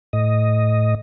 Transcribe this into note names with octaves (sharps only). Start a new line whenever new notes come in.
A2 D#5